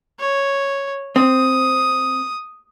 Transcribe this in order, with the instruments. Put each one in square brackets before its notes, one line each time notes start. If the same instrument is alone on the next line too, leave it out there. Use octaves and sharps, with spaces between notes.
[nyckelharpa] C#5
[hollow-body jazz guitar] C4 [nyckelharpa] D#6